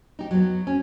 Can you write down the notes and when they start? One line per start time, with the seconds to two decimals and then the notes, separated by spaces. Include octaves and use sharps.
0.19 D#4 G4
0.31 F#3 B3
0.67 C#4